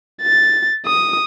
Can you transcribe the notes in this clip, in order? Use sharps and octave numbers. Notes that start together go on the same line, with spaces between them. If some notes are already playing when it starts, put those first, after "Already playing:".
A6
D#6